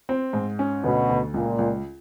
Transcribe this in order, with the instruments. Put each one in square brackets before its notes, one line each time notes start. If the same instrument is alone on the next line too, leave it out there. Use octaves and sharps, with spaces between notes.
[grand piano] C4
G#2
C#4
[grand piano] D2 [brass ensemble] B2
[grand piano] D2
[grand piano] C#2 [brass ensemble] A#2
[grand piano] C#2